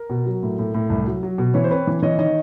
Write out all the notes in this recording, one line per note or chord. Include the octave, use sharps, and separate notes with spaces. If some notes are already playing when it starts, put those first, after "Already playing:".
Already playing: A#4
B2
F#3
A2
A2
A2
C2
F#3
F#3
B2
E3 B4 C#5
C5
C4 B4 C#5
E3
E3 C#5 D#5
D#3 C#5 D#5